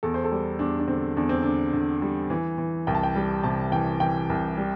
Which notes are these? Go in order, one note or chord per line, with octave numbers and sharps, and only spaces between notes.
E2 A4
C5
A4
G3
E2 D4
D4
D3 C4
E2 D4
C4
D3 D4
D3
G3
E3
E3
C2 G5
A5
G5
G3
C3 A5
E3 G5
E3 G5
C2
G3